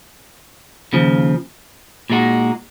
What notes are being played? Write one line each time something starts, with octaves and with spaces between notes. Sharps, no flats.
D#2 C#3 F3
A#2 G#3 D#4 F#4